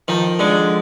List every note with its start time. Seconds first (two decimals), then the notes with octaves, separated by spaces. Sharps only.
0.08 D#3 F3
0.39 D3 G#3